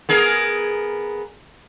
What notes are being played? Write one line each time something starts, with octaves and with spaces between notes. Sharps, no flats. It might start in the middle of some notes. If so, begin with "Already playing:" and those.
B3 G#4 A#4